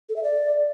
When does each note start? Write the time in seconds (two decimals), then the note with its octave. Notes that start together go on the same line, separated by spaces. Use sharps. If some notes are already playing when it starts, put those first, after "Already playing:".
0.09 A4
0.16 E5
0.23 D5